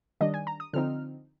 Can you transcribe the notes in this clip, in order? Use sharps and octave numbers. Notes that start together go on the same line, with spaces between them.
D#3 G3 D4 D#5
G#5
A#5
D#6
D3 F3 C4 D#4 F6